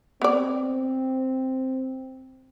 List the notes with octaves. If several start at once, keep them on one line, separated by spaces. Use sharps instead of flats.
B3 C4 D5